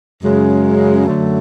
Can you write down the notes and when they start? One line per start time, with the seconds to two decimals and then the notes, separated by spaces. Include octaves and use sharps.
0.22 F#2 C#3 G#3
1.05 F#2 D3 F#3 A3